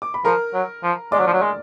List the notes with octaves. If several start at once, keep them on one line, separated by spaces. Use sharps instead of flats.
D6
B5
F3 A#4 A#5
F#3
F3
G#3 D5 D6
F#3
F3
F#3
G#3